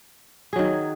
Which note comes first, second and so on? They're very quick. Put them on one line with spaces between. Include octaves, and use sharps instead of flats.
G#4 F#3 D#3